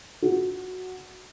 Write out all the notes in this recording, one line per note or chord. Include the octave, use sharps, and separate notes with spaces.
F#4